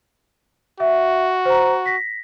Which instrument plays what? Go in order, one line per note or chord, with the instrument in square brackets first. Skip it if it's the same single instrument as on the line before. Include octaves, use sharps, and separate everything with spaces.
[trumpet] F#4 [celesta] E5
[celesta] C5 A#5
A#6 B6